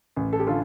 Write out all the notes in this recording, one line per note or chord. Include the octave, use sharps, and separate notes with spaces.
A1
A4
G4
D3 F4 A4